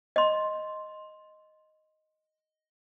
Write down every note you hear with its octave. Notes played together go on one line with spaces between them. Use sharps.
D#5 C6